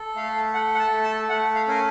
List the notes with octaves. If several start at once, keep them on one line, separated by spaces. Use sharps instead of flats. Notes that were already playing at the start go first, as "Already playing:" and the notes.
Already playing: A4
A3 F5
A4 F#5
F#5
A5
A3
A5
A3 F#5
F5
C#4 A#4